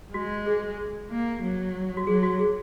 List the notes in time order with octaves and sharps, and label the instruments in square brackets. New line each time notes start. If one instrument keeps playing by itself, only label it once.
[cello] G#3 [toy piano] F#4
[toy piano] G#4
G#4
[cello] A#3
F#3
[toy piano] F#4
[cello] F#3 [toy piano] G#4
[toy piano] F#4
G#4